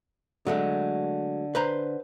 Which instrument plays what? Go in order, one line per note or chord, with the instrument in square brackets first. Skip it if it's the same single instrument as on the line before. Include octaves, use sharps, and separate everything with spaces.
[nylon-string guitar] D3 [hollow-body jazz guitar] F#3 G#3 A3
[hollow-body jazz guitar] B4 C5 A#5